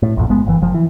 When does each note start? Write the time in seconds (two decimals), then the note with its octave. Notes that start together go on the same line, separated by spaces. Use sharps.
0.02 A2
0.17 A#1 F2
0.29 G#1 G#3 B3
0.46 F#1 E3
0.62 F#1 F3
0.74 E3